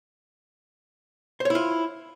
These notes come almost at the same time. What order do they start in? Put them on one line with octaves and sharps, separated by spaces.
C5 C#5 E4 F4